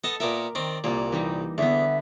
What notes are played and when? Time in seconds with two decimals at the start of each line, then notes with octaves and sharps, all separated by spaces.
0.04 B3 A4 D#5 A5
0.20 A#2 B3 A#4 E5 D6
0.55 D#3 C4 D5
0.84 C2 A#2 A#3 D5
1.12 E3 G3 D#4
1.58 E2 D3 B3 E5